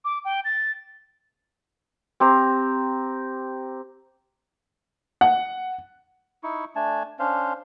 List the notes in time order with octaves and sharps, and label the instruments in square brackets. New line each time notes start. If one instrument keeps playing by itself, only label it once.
[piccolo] D6
G5
A6
[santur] C4 G4 C5 A#5
[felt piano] F#5
[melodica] D#4 E4 C#6
A3 D4 G#5 A5
C#4 D4 C5 F5